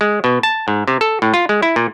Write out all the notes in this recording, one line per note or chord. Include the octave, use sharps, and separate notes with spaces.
G#3
B2
A5
G#2
C3
A4
A2
F4
G#3
E4
A#2